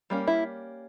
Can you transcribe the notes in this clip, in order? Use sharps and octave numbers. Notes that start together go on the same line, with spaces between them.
G3 A#3 C#4
E4